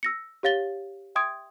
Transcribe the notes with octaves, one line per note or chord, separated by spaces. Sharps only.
E6 A#6 C#7
G4 C#5 F5 A6 G7
E5 G5 C6 D#6 G#6 D7